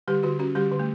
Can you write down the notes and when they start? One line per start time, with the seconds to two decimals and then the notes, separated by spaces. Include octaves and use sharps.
0.08 D3 G3 G4
0.23 D3 F#4
0.39 C#4 F#4
0.55 D3 G3 G4
0.72 D3
0.79 A3